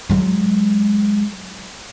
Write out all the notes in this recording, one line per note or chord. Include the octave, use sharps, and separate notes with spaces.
F#3 G#3